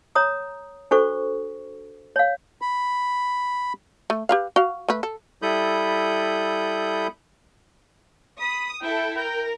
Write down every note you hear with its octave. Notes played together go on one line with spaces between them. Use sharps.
C#5 A#5 D#6
D4 F#4 A4 C5 C#6
C#5 F5
B5
A3
G4 B4 F5
F#4 F5
A3 B4
A4
G3 E4 A4 B5 D#6 G6
B5 D#6
E4 A4 G5
A#4 G5